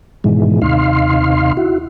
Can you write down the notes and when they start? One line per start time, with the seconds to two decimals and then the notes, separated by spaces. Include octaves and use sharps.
0.24 G#2 B2 D#3 E3 G#3
0.62 D#2 C3 D#4 F5 C6
1.57 E4 F#4